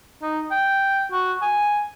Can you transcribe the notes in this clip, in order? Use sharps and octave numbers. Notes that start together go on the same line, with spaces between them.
D#4
G5
F#4
G#5